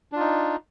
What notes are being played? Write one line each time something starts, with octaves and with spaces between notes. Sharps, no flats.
D4 D#4 F4